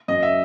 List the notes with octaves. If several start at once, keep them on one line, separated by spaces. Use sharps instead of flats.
F#2 D#5
E5